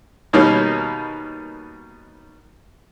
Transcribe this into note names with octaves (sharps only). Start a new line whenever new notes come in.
B2 D#3 G3 A#3 C#4 D#4